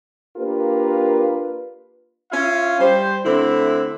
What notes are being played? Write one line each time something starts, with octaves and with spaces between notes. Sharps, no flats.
A#3 D4 F4 G4 A#4 B4
C#4 E4 F4 E5 F5
G3 C5
D3 A3 C4 E4